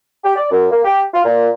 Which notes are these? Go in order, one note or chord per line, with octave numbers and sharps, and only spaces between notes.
G4
D5
F#2
A#3
G4
F4
A#2